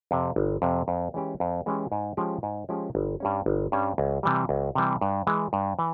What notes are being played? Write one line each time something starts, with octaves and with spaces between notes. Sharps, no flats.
F2 C3
G1
F2 C3
F2
E3 G#3 C#4 G4
F2
E3 G#3 C#4 G4
G#2
F3 G#3 C#4 G4
G#2
F3 G#3 C#4 G4
G1
G2 G3 C#4
G1
G2 G3 C#4
C#2
C3 E3 G3
C#2
C3 E3 G3
G2
E3 G#3
G2
E3